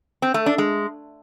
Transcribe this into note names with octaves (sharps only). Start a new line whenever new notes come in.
C4
A3
D4
G#3